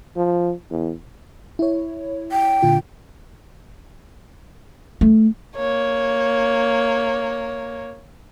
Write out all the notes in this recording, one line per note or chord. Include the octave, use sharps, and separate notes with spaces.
F3
E2
E4 C#5
G5
A#2 D3 F4
A3
A#3 C#5